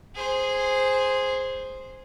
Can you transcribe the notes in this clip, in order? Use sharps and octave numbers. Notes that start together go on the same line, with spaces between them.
G#4 C5